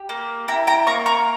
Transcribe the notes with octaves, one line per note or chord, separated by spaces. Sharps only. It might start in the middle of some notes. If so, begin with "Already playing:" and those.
Already playing: G4
A#3
E4 G5 A#5
G5 A#5
A#3 A#5 C#6
A#5 C#6